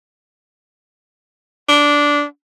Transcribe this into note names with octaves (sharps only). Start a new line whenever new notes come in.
D4